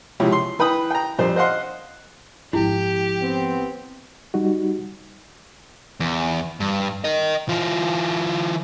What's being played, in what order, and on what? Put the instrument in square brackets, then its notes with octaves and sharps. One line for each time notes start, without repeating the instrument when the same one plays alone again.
[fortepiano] C#2 C3 F3 E4 C#5
C6
E3 B4 G5 B5 D#6
G5 A#5
F2 G3 D4 C5
C5 D#5 F5 F#5 C6
[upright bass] G#1 F3 [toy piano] E4 [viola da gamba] G4
[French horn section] B3 C4
[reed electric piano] G3 D#4 F#4
[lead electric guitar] E2
G2
A#4 D#5
E3 F4